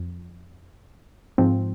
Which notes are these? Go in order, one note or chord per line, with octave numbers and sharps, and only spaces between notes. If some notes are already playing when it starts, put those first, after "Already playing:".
Already playing: F2
G#2 F3 C4